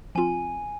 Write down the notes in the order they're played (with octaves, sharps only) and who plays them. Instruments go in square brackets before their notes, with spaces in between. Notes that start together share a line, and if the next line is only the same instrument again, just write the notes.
[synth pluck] F3 C4 F4 [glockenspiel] G#5